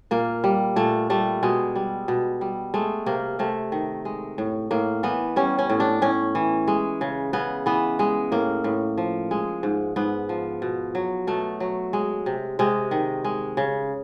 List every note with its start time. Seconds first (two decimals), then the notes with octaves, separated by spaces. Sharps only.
0.11 A#2 A#3
0.44 G3
0.76 A#2 A3
1.10 G3 A3
1.43 B2 G#3
1.76 G3
2.08 B2
2.41 G3
2.74 G#3 A3
3.06 C3 A#3
3.39 C3 A3
3.72 D#3
4.05 G#3
4.38 A2
4.71 A2 A#3
5.03 E3 B3
5.36 G3 C#4
5.59 C#4
5.70 A2
5.80 D4
6.02 A2 C#4
6.35 E3
6.68 G#3
7.01 C#3
7.33 C#3 B3
7.66 E3 B3
7.99 G#3
8.32 A2 A#3
8.64 A2
8.98 F3
9.31 G#3
9.63 G#2
9.96 G#2 B3
10.29 F3
10.62 B2
10.95 F#3
11.27 B2 A3
11.60 F#3
11.93 G#3
12.26 C3
12.59 C3 G#3
12.91 D#3
13.25 G#3
13.57 C#3